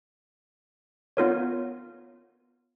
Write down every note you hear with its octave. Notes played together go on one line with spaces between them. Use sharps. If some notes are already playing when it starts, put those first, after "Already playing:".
B3 F4 A#4 C#5